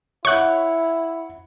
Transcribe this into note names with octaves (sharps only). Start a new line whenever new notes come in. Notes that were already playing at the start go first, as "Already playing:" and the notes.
E4 C#5 E5 F#5 C#6 F#6